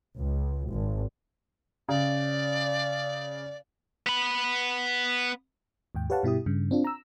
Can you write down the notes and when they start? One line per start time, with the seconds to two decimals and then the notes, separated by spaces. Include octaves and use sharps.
0.16 C#2
0.70 G#1
1.89 C#3 D5
4.06 B3 B5
5.95 D#2 G#2 G5
6.10 G4 B4 C#5 F5 F#5 A5
6.23 G2 B2 E4 G4 D#6
6.46 G2 C#3
6.71 C4 D4 F4
6.84 A#5 E6